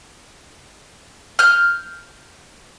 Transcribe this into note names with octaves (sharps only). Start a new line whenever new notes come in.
F6 G6